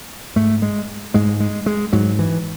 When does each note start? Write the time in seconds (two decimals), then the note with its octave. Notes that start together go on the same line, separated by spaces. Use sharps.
0.36 G#2 A3
0.62 G#3
1.14 G#2 G#3
1.40 G#3
1.66 G#3
1.93 G#2 F#3
2.19 E3